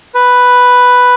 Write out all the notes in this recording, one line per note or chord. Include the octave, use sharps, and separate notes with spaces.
B4